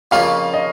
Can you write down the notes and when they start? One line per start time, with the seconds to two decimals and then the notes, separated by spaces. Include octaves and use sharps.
0.11 F2 C#3 A#3 C#4 F4 F5
0.53 D#5